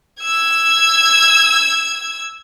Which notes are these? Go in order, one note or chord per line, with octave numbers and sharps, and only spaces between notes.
E6 G#6